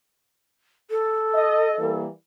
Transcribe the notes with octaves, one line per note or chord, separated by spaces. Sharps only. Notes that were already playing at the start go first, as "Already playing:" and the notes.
A4
D#5
E3 G3 A#3